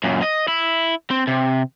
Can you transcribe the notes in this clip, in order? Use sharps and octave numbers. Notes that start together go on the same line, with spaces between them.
F#2 A#2
D#5
E4
C4
C3